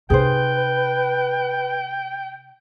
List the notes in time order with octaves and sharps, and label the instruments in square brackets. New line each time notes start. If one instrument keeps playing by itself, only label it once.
[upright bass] C3 D#4 [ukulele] G#4 C5 [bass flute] B4 [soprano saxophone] G5